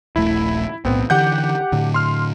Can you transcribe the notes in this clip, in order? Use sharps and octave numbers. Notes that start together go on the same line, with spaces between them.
D#1 A#1 A3 E4
B1 A2 B3 C4
D3 E3 G4 F#5 G6
A2 D3
C6 F6